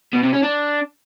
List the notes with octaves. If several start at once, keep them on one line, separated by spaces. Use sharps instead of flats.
B2
C3
C#4
D4